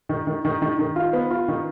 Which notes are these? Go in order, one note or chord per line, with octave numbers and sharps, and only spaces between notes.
D#3
D#3
D#3
D#3
D#3
F4
B3
F4
D#3